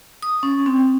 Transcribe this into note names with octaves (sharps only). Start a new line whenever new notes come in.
D#6
C#4
C4